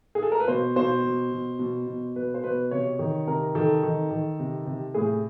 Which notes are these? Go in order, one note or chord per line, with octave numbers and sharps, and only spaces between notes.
G#4
A4
A#4
B4
B2 C5
B2 C5
B2
B2
B2
B2
B2 B4
C5
B2 B4
C3 C#5
D#3
C3 A#4
D#3 A4
D#3
D#3
C3
C3
A2 G#4